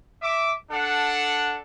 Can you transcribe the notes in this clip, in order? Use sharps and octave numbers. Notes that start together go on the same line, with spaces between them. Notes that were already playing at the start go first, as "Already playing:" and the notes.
E5 D6
D4 A4 F#5